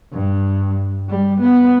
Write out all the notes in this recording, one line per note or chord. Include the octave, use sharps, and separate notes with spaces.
G2
G3
B3